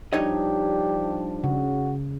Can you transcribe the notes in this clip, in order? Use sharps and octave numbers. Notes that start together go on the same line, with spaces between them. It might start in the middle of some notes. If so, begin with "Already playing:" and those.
F3 G3 D4 D#4 G4 C#5 D#5
C#3 F#4